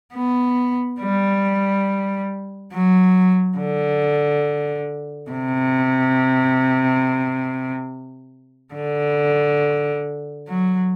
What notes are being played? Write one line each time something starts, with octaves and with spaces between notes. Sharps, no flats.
B3
G3
F#3
D3
C3
D3
F#3